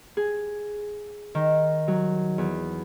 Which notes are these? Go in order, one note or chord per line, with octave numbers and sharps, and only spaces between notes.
G#4
D#3
F#3
E2